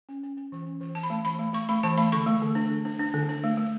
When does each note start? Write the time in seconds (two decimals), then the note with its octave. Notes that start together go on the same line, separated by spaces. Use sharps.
0.09 C#4
0.23 C#4
0.37 C#4
0.52 E3
0.67 C#4
0.81 E3
0.95 E3 A5
1.03 B5
1.10 A3 A5
1.25 E3 B5
1.39 A3
1.53 A3 C#6
1.69 A3 B5
1.83 E3 A5
1.98 A3 B5
2.12 D3 C#6
2.26 A3
2.42 D3
2.55 D4
2.70 D3
2.85 D4
2.99 D4
3.14 D3
3.29 D4
3.44 A3
3.57 A3